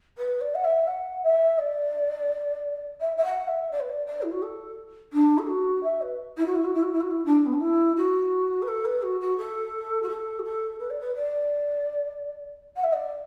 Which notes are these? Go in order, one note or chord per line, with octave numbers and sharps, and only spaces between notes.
B4
D5
F#5
E5
F#5
E5
D5
E5
E5
F#5
E5
D5
B4
D5
D5
E4
F#4
A4
D4
A4
F#4
E5
B4
E4
F#4
E4
F#4
E4
F#4
E4
F#4
E4
D4
B3
D4
E4
F#4
B4
A4
B4
F#4
F#4
A4
F#4
A4
F#4
A4
B4
D5
B4
D5
F#5
E5
D5